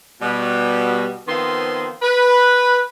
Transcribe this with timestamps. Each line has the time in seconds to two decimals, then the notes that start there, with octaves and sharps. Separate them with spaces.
0.22 B2 G3
1.28 D#3 F3 B3 C4 C6
2.03 B4